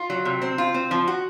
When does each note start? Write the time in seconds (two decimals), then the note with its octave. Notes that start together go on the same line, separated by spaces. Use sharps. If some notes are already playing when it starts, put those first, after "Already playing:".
Already playing: F4
0.10 F#3
0.25 C3
0.42 C4
0.58 F4
0.74 C4
0.91 F3
1.08 F#4